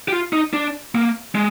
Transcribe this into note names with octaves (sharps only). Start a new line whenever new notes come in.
G4
F4
D#4
D4
A#3
G#3